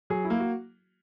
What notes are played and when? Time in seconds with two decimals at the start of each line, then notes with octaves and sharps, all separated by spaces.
0.10 F#3 G#4
0.25 E4
0.30 A#3
0.40 F#4